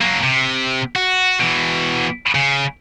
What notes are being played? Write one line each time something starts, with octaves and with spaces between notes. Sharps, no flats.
F#3 A#3
C3
F#4
B2 E3
C#3